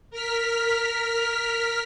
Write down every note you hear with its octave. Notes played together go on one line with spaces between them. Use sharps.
A#4 F6 B6